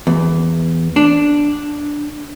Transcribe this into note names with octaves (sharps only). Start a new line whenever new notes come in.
E2
D4